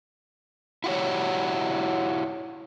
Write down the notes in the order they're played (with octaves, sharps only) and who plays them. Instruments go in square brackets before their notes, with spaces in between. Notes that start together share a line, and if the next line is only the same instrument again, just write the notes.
[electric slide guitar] E4 F#4 G4 C#5